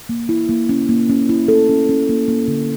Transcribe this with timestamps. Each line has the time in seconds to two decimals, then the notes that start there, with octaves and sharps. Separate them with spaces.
0.09 A#3
0.29 E4
0.49 A#3
0.69 C#4
0.89 A#3
1.09 C#4
1.29 E4
1.48 A4
1.69 C#4
1.89 C#4
2.09 A#3
2.28 A#3
2.48 D3